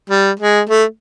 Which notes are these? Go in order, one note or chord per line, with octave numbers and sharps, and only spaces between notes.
G3
G#3
A3